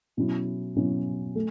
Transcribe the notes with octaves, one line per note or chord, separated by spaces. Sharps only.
B2 F#3 C#4 E4
B2 F#3 C#4 E4
A3